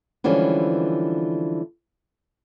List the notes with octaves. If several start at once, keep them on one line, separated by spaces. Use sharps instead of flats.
D3 E3 F3 G3 G#3 C#4